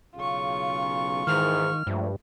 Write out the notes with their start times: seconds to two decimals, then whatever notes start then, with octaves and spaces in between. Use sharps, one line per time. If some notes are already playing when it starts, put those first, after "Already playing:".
0.16 B1 C#3 F4 C#6
1.27 G#2 D#3 E3 F6
1.87 G2 F3 G#3 A3